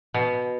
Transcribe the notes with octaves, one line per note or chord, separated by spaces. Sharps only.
B2